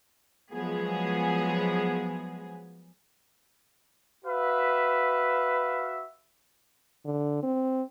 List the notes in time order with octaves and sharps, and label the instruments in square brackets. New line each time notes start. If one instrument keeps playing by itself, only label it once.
[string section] F3 F#3 G#3 B3 G#4
[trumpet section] F#4 B4 E5 F5
[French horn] D3
C4